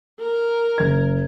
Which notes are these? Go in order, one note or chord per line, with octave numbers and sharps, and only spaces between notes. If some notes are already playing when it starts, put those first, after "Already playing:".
A#4
F#1 G#6